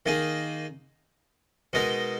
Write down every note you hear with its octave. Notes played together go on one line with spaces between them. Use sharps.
D#3 A#3 D#4 G#4
B2 G#3 D#4 A#4